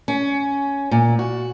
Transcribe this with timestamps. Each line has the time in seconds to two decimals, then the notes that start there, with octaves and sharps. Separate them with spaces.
0.08 C#4
0.91 A#2
1.19 F#4